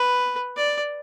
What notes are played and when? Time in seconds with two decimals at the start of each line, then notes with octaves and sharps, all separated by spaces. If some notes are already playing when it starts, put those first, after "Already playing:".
Already playing: B4
0.57 D5